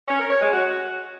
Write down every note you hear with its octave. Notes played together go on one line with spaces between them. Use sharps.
C#4
A#4
C#5
G#3
F#4